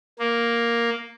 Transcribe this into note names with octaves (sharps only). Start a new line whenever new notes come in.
A#3